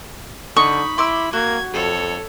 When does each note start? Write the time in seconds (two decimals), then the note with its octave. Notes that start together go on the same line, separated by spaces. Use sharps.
0.57 D3 D#4 B5 C#6
0.98 E4 C6 D6 E6
1.33 A#3 F#4 G#6
1.74 F2 A4 C#5